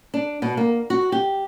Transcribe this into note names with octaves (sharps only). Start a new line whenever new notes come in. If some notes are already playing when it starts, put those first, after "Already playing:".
D4
B2
A#3
F#4
G4